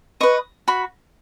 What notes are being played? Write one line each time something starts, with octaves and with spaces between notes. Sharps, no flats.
B4 D#5 C#6
F#4 B5